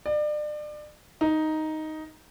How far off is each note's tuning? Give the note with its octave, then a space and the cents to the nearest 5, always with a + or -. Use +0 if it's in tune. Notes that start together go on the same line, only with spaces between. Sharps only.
D5 +35
D#4 +5